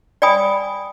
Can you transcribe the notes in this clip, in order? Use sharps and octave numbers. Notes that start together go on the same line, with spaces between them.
D5 G5 G#5 B5 D#6